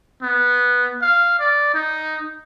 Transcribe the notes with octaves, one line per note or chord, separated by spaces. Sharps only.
B3
F5
D5
D#4